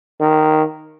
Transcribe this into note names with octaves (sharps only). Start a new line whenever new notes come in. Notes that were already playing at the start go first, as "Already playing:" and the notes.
D#3